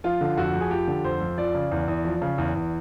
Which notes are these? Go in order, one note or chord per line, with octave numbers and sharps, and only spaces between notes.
F3 F4
D3
F2 F#4
F2
G#4
F3 G4
D3
F2 C5
F2
F3 D5
C#3
E2
E2
F3
C#3
E2
E2